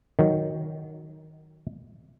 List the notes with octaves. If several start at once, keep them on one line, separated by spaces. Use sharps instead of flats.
D#3 F#3